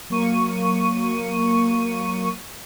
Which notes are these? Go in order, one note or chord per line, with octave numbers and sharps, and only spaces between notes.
F#3 A#3 C#6 D#7